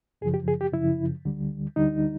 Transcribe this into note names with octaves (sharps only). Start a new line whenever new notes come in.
F#2 C#3 F3 G#4
G4
G#4
G4
F#2 C#3 F3 E4
D2 D3 G3
D2 D3 G3 D#4